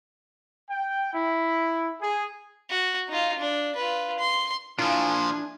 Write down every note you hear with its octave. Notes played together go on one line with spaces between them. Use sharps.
G5
E4
G#4
F#4
D#4 F4
D4
F4 B4
C6
A#2 F3 D4 E4 F4 G#5